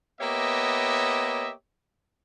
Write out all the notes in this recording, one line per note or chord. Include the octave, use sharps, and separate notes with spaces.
A#3 B3 G4 C#5 D#5 E5